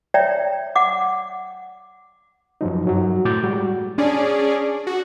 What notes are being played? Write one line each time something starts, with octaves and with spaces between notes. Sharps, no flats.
C#5 D5 E5 G5 A#5
F#5 D6
F#2 F3 F#3 D#4
G2 F#3 F#4
A2 D6 G6 A6
G3 G#3 F#4
C#4 D4 G#4 D5
F#4